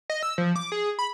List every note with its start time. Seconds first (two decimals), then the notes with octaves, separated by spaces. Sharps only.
0.10 D#5
0.23 E6
0.38 F3
0.56 D6
0.72 G#4
0.99 B5